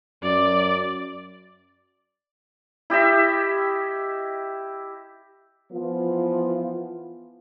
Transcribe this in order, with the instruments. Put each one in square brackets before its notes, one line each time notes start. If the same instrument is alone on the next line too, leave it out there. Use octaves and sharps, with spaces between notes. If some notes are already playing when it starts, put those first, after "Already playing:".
[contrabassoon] F#2 [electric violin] D5
[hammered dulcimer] E4 G4 D#5 E5
[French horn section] E3 F3 B3 F4